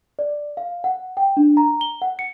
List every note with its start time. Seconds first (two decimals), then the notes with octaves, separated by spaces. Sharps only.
0.19 D5
0.57 F5
0.84 F#5
1.17 G5
1.37 D4
1.57 A#5
1.81 G7
2.02 F#5
2.19 C#7